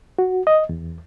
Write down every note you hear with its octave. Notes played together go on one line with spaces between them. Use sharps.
F#4
D#5
E2